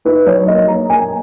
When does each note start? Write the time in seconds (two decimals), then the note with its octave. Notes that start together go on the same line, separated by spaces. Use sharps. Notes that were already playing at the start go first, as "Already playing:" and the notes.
0.05 D#4 B4
0.26 F#3 C#5
0.47 A#3 D#5
0.68 A#3 A#5
0.90 A#3 G#5